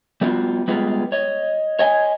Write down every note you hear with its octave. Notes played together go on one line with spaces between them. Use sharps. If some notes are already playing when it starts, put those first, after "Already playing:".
G3 A3 B3 D#4 F4 F#4
G3 G#3 B3 F4
C#5 D#5
C#5 D#5 G5 G#5